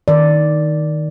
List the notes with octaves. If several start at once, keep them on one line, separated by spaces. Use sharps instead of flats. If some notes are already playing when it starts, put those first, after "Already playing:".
D#3 D5